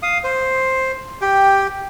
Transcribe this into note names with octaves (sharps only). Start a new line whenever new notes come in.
F5 D#6
C5
G4 G5